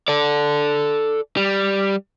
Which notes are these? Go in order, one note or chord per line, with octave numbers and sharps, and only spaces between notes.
A4 D5
G3